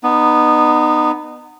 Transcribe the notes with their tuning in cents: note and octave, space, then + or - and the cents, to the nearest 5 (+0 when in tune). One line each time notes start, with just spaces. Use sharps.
B3 +0 D#4 -30